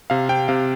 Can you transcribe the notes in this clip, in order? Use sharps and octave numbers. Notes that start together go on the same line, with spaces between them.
C3 F5
C3 G5
C3 F5